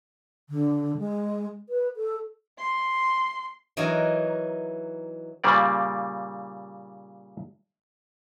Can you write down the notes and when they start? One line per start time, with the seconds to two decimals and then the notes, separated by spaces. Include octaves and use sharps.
0.50 D3
0.98 G#3
1.69 B4
1.97 A4
2.59 C6
3.77 E3 F#3 D#4 F#4 A#4
5.44 A#2 C#3 G3 A#3 D5